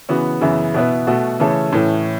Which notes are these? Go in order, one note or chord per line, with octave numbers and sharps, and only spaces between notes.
C#3 E3 B3 F#4
F#2 C#3 E3 B3 E4
B2 B3 E4 B4
B2 A3 F#4
C#3 E3 A3 C#4 A4
A2 E3 A3 C#4